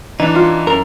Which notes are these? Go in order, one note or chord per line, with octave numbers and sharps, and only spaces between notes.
E3 D4 D#4
E4 F4
F#2 A#4